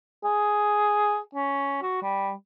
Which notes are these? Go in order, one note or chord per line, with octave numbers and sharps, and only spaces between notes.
G#4
C#4
F#4
G3